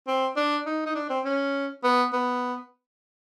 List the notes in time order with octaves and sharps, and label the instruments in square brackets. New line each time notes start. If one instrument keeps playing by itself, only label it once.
[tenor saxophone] C4
D4
D#4
D#4
D4
C4
C#4
B3
B3